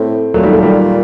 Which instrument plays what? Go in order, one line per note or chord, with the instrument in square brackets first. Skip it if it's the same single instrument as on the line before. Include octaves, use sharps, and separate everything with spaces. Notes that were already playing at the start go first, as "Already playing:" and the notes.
Already playing: [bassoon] A2 [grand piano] A3 C4
[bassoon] A#2 [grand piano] F#3 A3
[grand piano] D#3 G3
F#3 A3
D#3 G3